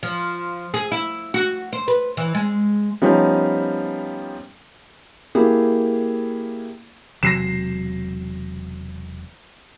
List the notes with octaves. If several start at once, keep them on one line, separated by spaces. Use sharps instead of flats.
F3
G#4
E4
F#4
C5
B4
E3
G#3
F3 G3 B3 C#4 D#4
A#3 E4 G4 G#4
E1 C3 F#3 A#6 C7 E7